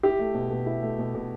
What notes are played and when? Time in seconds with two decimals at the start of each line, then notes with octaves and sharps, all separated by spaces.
0.03 E4 G4
0.19 A3
0.34 B2
0.51 B2
0.66 E4
0.82 A3
0.99 B2
1.14 B2